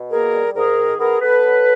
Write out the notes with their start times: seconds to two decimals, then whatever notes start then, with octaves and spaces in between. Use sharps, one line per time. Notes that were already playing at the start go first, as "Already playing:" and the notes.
Already playing: B2
0.11 A#3 G#4 A#4
0.34 G3
0.55 G#2 G#4 A#4
0.78 D#3
0.99 B3 G#4 A#4
1.21 B3 A4 B4
1.43 F#3